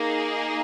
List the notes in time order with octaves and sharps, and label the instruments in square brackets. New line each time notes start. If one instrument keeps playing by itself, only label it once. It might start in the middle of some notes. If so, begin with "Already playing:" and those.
Already playing: [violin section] A#3 D#4 G#4